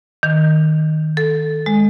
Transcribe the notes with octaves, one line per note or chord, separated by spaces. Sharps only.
D#3
A4
G#3